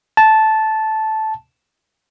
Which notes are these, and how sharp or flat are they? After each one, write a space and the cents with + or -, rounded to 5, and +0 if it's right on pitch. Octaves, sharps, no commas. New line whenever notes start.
A5 -10